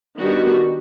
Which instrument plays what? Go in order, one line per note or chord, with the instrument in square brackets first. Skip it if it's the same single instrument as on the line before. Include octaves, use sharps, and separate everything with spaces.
[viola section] D#3 G3 B3 D4 F#4